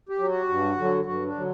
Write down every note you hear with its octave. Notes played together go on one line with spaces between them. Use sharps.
G4
F#3
F#4
G2
D3 F#3
G2 F#4
D4
D3 F#3